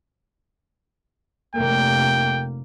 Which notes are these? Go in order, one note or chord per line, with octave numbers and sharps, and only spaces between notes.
F1 A#3 G5